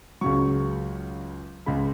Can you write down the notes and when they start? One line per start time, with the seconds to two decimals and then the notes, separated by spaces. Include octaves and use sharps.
0.21 C#2 C#3 F#3 C#6
1.66 C#2 C#3 G#3 B5